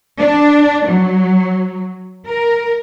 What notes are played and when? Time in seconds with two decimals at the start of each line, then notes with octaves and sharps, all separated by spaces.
0.18 D4
0.88 F#3
2.26 A#4